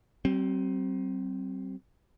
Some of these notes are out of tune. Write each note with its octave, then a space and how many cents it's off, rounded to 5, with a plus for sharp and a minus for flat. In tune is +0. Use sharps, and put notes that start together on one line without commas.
G3 -45 C4 +10